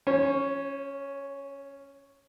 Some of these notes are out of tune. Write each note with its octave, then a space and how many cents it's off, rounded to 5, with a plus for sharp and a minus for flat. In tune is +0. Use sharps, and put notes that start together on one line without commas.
C#4 +0 C#5 -45